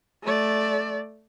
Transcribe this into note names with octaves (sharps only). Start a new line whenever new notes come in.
A3 D5